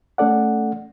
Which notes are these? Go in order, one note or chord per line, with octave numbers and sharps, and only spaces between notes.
A3 C#4 A4 D5 F#5